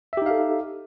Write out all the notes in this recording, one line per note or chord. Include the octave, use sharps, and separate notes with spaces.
D#4 G4 A4 E5 F5